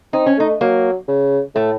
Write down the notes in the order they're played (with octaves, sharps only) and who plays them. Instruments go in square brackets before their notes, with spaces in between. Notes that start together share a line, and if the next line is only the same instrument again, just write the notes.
[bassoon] C4 [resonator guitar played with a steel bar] D#4
[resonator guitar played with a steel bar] C#4
[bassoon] A3 [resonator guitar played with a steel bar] D#4
[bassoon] F#3 [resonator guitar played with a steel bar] A#3
[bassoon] C#3
[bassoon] A2 [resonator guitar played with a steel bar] A3